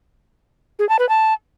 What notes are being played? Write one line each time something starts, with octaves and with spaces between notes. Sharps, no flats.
G#4
A5
B4
A5